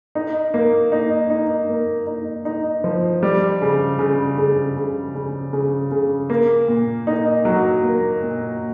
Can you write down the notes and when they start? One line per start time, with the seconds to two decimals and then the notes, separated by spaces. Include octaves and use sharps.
0.15 D#4
0.54 A#3
0.92 D#4
1.30 D#4
1.69 A#3
2.07 D#4
2.45 D#4
2.84 F3
3.23 G3
3.62 C#3
3.99 C#3
4.38 C#3
4.76 C#3
5.15 C#3
5.53 C#3
5.91 C#3
6.30 A#3
6.68 A#2
7.07 D#4
7.45 F#3
7.83 A#3
8.22 A#2